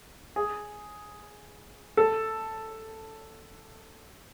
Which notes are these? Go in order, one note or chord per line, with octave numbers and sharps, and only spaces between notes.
G#4
A4